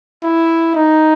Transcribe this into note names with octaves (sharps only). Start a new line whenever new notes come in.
E4
D#4